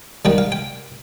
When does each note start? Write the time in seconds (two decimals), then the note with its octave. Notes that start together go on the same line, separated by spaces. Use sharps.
0.25 D#2 D#3 G3 G5
0.38 F5
0.52 G5